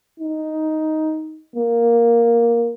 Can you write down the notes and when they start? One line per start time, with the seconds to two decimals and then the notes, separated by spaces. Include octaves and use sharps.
0.20 D#4
1.56 A#3